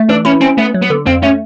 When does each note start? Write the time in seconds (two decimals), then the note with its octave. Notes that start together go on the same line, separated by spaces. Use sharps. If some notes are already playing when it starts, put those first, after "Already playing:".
Already playing: A3
0.09 E3 D4
0.25 C#4 E4
0.41 C4 C#4
0.58 A3 B3
0.74 F#3
0.82 B3
0.90 D3
1.06 F2 C4
1.23 A3 C#4